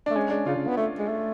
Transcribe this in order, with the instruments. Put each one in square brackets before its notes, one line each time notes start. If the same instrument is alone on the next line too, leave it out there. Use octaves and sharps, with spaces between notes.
[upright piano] D4
[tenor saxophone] A3
[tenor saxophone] G#3 [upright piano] C#4
[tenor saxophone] G#3 [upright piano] D4
[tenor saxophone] C#3 [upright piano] F4
[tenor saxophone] C#3
B3
A3
G#3
A3